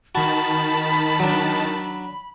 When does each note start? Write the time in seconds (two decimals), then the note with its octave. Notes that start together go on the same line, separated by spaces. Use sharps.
0.15 D#3 F#4 A5 B5
1.20 F#3 D4